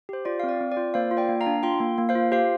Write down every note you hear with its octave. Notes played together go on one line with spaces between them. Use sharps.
G4 C5
F4 D5
F5
C4
D5
C4
D5
F4
A#3 C5 F5
F4
D5 G5
A#3
F5 A#5
D4
F4 G5 C6
A#3
A#3
C5 F5
F4
G4 C5 F5